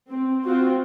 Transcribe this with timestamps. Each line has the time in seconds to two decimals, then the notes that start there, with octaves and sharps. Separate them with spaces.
0.10 C4
0.45 C4 F4 F#4